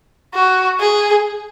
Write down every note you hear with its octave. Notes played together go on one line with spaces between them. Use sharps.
F#4
G#4